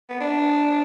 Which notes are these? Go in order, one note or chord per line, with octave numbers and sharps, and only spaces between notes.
B3
D4